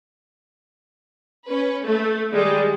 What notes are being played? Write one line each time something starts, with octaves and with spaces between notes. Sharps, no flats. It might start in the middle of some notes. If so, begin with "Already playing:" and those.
C#4 B4
A3
D#3 G3 G#3